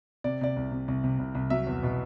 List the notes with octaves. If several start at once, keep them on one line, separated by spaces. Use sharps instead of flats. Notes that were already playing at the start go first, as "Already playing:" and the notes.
C3 D5
C3 D5
C2
C3
C2
C3
C2
C2
F#3 E5
E2
B2